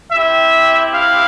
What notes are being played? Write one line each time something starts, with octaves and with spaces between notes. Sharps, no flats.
C4 E4 G4 E5
F5